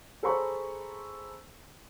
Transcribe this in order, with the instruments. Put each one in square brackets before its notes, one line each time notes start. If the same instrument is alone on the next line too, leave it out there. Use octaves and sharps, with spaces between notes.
[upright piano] G#4 A4 C5 A#5 B5 C#6